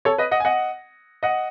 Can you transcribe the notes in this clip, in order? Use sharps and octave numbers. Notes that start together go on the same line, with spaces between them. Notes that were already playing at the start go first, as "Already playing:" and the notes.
A4 C#5
B4 D#5
D#5 F#5
G#5
D#5 F#5
D#5 F#5